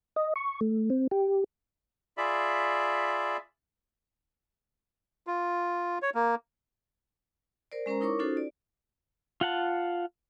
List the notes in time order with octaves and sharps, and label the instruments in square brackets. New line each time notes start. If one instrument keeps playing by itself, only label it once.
[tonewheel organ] D#5
C#6
A3
C4
G4
[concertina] F4 G#4 D5 E5 B5
[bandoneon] F4
C#5
A#3
[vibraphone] A#4 C5 D5
G#3 C#4 A#4 C5 A#5
D#4 E4 A#4 C#5 C#6 D6
C#4 D#4 F4 F#4 A4 C5
D5
[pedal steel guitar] F4 F#5 A5